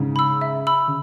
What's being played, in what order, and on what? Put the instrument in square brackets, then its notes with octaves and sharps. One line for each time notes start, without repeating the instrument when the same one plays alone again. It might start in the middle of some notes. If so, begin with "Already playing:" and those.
Already playing: [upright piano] G#2 C#3
[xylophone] B5 E6
E5
B5 E6
[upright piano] C#3